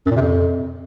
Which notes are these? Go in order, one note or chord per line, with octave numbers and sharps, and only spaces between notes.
F#2
A#2
C3
F2